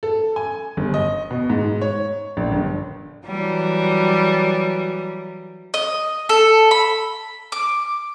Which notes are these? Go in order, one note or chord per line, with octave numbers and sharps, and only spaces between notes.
A4
G#5
G1
D#5
B2
G#2
C#5
A#1
G1
E3 F#3 G3
D#5
A4
B5
D6